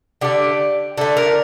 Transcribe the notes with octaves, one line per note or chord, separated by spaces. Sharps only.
D3 A3 G4
D3 A3 A4
A#4